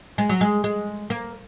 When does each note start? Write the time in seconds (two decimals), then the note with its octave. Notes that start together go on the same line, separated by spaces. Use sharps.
0.18 G#3
0.29 F#3
0.41 G#3
0.64 G#3
1.10 A#3